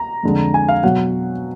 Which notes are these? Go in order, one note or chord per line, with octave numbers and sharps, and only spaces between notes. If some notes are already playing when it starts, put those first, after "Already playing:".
Already playing: A#5
F2 D3 G#3
G#5
F5
B2 F#3 F#5